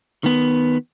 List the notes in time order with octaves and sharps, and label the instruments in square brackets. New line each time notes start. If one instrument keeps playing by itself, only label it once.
[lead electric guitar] D#3 B3